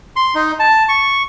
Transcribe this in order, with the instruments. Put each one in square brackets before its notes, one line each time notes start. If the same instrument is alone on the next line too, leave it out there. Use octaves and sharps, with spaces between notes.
[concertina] C6
D#4
A5
C#6